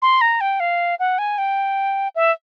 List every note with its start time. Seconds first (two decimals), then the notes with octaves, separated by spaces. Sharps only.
0.02 C6
0.21 A#5
0.41 G5
0.60 F5
0.99 F#5
1.18 G#5
1.38 G5
2.15 E5